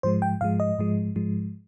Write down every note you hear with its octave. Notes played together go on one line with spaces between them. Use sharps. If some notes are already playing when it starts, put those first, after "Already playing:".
G#2 F3 G#3 C5
G5
G#2 F3 G#3 F5
D#5
G#2 F3 G#3
G#2 F3 G#3